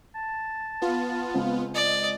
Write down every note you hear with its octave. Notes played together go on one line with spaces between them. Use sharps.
A5
B3 F4
C#2 C4
D5 D#5